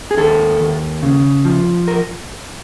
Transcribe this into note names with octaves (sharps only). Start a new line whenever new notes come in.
G#4
D#2 A4
D#2
C#3
F3
A#4